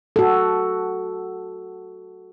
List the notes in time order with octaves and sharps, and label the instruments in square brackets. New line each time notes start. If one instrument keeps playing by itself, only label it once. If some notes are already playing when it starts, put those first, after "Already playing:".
[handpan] F#4 A4